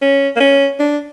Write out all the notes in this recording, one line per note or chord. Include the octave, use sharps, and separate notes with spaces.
C#4
A#3
C#4
D4